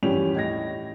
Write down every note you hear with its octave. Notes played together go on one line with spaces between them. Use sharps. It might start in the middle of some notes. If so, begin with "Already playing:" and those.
E2 G2 F3 C#4 G4 F7
A2 D#5 G#6 A#6